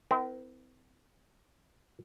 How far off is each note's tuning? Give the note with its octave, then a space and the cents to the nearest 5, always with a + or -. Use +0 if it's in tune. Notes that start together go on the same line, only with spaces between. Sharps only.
C4 -35 E4 -25 A#4 +0